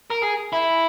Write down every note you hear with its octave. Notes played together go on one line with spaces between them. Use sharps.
A#4
G#4
E4